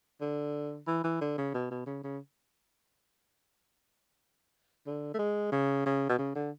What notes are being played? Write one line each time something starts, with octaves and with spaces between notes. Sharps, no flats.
D3
E3
E3
D3
C#3
B2
B2
C#3
C#3
D3
A3
G#3
C#3
C#3
B2
C#3
D3